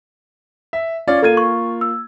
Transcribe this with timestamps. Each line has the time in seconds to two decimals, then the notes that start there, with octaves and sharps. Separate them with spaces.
0.73 E5
1.07 C#4 F4 D5
1.22 A#3 F4 A4 G#6 D#7
1.37 C#6
1.81 E6